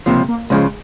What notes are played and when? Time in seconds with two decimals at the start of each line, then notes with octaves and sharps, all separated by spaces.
0.06 C#2 C3 F3 A#3
0.28 A#3
0.50 C#2 C#3 F3 G#3